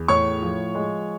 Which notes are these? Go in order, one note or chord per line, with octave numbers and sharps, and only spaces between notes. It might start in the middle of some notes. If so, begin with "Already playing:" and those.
Already playing: E2
A2 C#5 C#6
F3
G#3